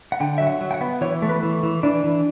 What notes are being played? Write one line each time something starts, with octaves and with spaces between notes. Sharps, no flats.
F#5
D3 G5
F#3 E5
F#5
F#3
G5
F#5
B3
E3 C#5
A3
B4
E3
E3
E3 D4
E3